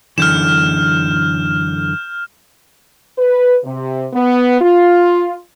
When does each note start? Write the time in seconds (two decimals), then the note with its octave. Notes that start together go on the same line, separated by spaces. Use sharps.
0.18 F#2 D3 E3 F6 G6 E7
3.18 B4
3.64 C3
4.13 B3
4.60 F4